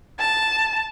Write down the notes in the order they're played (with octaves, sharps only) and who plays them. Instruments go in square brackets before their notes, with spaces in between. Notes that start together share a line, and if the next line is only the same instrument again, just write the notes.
[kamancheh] A5